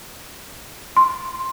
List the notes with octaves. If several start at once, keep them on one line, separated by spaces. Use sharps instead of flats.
C6